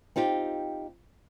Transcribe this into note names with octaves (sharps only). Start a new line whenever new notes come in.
C4 D#4 F4 G4